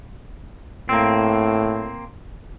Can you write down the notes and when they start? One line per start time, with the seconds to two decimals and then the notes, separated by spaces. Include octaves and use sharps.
0.89 A2 A#3 C4